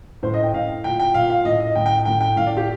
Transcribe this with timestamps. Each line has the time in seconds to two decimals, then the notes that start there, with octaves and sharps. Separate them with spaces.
0.23 A2 C5
0.34 D#5
0.43 G5
0.53 A2 F5
0.84 A#2 G5
1.00 G5
1.14 A#2 F5
1.30 F5
1.44 A2 D#5
1.60 D#5
1.75 A2 G5
1.86 G5
2.05 A2 G5
2.21 G5
2.36 A2 F5
2.47 D5
2.57 G4